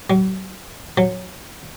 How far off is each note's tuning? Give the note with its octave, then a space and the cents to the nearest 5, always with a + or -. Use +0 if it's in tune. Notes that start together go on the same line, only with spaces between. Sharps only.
F#3 +40
F#3 -15